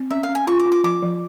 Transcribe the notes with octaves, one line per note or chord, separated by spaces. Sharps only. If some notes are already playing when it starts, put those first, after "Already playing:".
Already playing: C4
C#4 E5
F5
C#4
G#5
F4 C#6
D6
F4
D6
F3 D6
F3